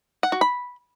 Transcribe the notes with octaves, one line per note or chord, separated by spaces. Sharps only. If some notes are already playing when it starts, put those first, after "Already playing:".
F#5
F#4
B5